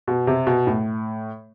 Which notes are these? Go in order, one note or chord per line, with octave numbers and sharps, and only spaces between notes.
B2
C3
B2
A2